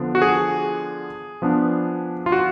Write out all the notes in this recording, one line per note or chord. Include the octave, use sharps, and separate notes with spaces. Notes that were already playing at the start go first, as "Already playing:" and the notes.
Already playing: D3 F3 B3 D4
F#4
G#4
F3 B3 D4
F4
F#4